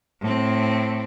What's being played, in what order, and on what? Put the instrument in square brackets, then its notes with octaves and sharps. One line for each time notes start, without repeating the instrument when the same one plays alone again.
[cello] A2 C4